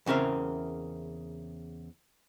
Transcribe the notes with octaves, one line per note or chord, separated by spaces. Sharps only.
E2 C#3 C4 A#4 E5